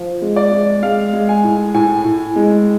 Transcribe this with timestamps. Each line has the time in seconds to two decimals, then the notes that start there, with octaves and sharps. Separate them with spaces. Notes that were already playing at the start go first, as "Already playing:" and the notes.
Already playing: F3
0.22 G#3
0.36 D5
0.52 G#3
0.83 G#3 F5
1.13 G#3
1.29 G#5
1.44 A2
1.74 A2 G#5
2.05 A2
2.36 G#3